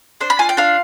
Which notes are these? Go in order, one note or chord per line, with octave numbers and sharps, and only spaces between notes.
D4 C5
B5
F4 G#5
G5
D4 F5